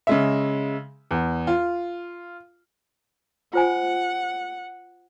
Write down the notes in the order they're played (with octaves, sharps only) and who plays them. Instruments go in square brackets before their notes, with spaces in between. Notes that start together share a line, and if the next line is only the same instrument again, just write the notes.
[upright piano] C#3 G#3 E5
E2
F4
[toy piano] F4 C5 G#5 [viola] F#5